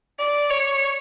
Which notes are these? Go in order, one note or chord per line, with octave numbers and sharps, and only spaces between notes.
D5
C#5